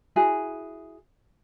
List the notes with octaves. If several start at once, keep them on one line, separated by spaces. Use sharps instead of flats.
E4 F#4 G#4